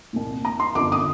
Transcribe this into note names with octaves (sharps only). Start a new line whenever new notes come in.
C2 A#2
A#5
C6
G1 F2 D3 D6
D#6